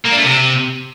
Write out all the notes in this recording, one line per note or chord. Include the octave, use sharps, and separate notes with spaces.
A#3
D4
A3
C3